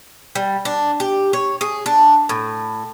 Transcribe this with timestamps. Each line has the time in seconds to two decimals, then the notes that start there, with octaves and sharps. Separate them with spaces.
0.35 G3
0.65 D4
1.00 G4
1.33 C#5
1.61 G#4
1.86 D4
2.29 A2